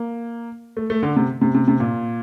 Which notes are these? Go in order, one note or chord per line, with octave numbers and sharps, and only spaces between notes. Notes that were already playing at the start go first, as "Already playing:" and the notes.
Already playing: A#3
A3
A3
D3
C3
C3
C3
C3
A#2